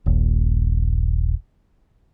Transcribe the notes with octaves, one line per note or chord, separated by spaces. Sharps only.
D#1 A#1